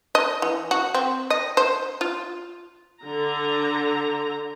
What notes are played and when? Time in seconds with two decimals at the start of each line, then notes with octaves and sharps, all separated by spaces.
0.15 D#5
0.42 E3
0.71 F#4
0.95 C4
1.30 D#5
1.57 C5
2.01 F4
3.01 D3 A#5